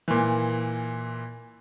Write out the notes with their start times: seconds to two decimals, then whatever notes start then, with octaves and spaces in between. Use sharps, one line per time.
0.08 A#2 E3